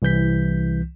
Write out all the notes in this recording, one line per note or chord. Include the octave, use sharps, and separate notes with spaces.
C2 E3 G6 B6